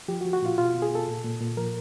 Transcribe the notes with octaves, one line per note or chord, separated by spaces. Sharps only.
F3 G4
F#4
F3
F#4
A#2 F4
B2 F4
B2
G#4
B2 A4
A#2
A#2
A#2
F3 A#4